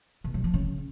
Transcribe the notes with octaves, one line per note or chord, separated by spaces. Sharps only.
B2
F#3
F3
C#3